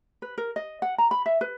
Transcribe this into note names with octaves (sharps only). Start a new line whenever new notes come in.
B4
A#4
D#5
F#5
A#5
B5
E5
B4